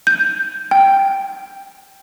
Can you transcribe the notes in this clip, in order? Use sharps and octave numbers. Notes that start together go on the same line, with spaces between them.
G6
G5